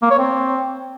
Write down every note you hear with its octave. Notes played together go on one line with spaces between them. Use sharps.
A#3
C#5
C4